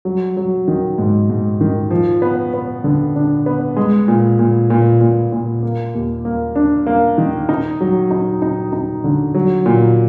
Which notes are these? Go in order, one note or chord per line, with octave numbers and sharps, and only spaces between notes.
F#3
F#3
D#3
G#2
G#2
D#3
F3
B3
B3
D3
D4
B3
G#3
A#2
A#2
A#2
A#2
A#2
A#3
D#2
A#3
D4
A#3
D#3
D#4
F#3
D#4
D#4
D#4
D3
F#3
A#2